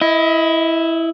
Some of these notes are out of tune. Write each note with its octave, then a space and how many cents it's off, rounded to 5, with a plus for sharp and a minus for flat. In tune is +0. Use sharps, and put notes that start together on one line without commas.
E4 +0 D#5 +30